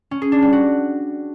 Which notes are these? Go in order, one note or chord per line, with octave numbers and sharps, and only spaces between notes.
C#4
G#4
D4
G3
F#4